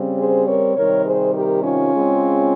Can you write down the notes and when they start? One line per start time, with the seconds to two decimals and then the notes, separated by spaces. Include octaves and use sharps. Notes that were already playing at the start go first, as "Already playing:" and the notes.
Already playing: C#3 G3 C4
0.18 G#4 C5
0.46 A#4 C#5
0.75 C3 D#3 G3 A#4 C#5
1.05 G#4 C5
1.34 G4 A#4
1.63 C#4 F4
1.91 C#3 G#3 C4